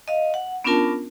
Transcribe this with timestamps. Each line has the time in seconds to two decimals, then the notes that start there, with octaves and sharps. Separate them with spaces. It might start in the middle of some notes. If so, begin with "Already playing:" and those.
0.08 D#5 F5
0.34 F#5
0.64 B3 C#4 D4 F4 A#4 A5